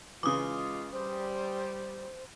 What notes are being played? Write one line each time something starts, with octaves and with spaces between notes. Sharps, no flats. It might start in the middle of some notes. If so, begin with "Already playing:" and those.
C#3 E3 G#3 F4 D6 D#6
G3 C5